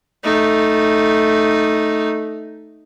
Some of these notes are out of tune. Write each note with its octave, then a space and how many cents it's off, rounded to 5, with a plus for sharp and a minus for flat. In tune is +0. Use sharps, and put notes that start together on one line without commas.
A3 +0 D#4 -5